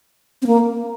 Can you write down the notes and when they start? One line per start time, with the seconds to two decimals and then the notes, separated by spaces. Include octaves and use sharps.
0.42 C4
0.47 A#3